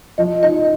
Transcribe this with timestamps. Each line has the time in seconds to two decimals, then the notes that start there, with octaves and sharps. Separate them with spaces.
0.18 F3 D#5
0.43 D#4 D#5